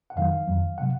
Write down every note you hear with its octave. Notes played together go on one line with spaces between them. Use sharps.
F#5
F2 D#3 F#3 F5
F2 D#3 F#3
C3 F#3 F#5